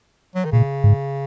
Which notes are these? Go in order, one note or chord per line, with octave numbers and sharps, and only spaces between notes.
F#3
D#3
A#2 C#3
G#2